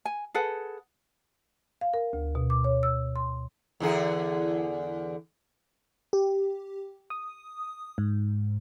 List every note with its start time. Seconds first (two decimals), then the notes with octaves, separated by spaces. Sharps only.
0.05 G#5
0.34 G#4 A4 B4 F#5
1.81 F5
1.94 A#4
2.13 D2
2.35 B2
2.50 D6
2.64 C#5
2.83 E6
3.16 C6
3.80 E2 D3 G#4
6.13 G4
7.10 D#6
7.98 G#2